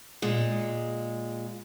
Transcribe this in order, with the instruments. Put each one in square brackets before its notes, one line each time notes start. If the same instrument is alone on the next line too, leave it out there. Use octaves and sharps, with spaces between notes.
[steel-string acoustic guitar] A#2 G#3